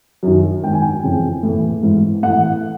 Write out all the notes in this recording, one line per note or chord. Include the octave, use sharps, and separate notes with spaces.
F#2 D#3
G#2 D#3 G5
G#5
G5
F2 C#3 E3
A2 E3
G#2 E3
A2 E3 F#5